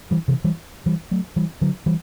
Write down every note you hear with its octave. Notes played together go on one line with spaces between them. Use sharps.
E3 G3
C3 E3
E3 G3
E3 G3
F#3 A3
E3 G3
D3 F#3
E3 G3